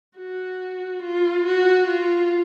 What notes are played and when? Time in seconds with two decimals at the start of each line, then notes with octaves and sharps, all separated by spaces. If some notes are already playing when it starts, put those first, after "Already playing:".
0.18 F#4
1.03 F4
1.45 F#4
1.87 F4